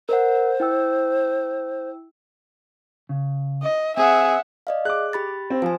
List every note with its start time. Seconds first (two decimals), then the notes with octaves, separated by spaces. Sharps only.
0.09 A#4 C5 D#5 F#5
0.60 E4 G5 E6
3.09 C#3
3.63 D#5
3.97 C4 G#4 E5 F#5
4.67 D5 D#5 F5
4.85 G#4 D6 F#6
5.13 G4 B5 A6
5.50 C4
5.62 F3 C5 G#5